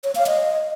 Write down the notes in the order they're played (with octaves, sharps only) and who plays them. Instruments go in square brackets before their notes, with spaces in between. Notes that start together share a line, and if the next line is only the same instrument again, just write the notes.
[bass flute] C#5
F5
D#5